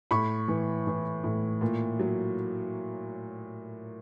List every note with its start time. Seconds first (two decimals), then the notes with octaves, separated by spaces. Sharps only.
0.11 A2 B5 C#6
0.48 E3
0.87 E3
1.24 A2
1.61 A#2
1.99 F#3